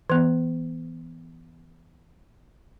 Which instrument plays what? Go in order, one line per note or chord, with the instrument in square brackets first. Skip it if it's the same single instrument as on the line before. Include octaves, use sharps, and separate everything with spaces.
[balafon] E3 B3